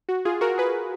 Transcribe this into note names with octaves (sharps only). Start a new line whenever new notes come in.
F#4
F4 G#4
F#4 A#4
G#4 B4